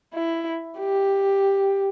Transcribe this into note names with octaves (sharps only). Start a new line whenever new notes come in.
E4
G4